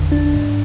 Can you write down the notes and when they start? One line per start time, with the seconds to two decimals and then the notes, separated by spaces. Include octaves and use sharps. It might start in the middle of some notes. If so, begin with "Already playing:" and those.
Already playing: G#1 E2 D3
0.12 D4
0.34 G#2